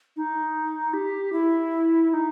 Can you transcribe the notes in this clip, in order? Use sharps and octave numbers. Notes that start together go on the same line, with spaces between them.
D#4
G4
E4
E4
D#4